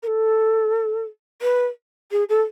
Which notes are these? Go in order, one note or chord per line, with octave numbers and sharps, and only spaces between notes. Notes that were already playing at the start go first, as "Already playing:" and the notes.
A#4
A4
B4
G#4
A4